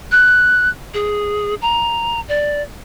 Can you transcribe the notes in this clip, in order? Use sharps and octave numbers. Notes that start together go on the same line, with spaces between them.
F#6
G#4
A#5
D5